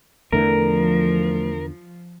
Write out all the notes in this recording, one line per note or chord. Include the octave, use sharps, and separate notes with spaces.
E2 D3 E3 F3 A3 A#4